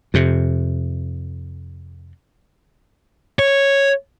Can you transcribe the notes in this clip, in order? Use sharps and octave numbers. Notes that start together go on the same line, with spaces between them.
F2 C3
C#5